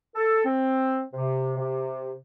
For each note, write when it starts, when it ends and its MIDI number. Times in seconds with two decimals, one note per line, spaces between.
0.15 0.43 69
0.45 1.03 60
1.13 1.53 48
1.57 2.14 48